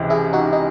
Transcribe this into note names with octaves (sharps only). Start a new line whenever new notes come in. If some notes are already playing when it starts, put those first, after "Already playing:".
Already playing: C#2 C3 E3
E4 G#4
D#4 F#4
D#4